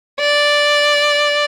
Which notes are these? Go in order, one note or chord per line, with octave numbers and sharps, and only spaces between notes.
D5